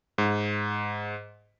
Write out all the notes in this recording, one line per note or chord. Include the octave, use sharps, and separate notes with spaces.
G#2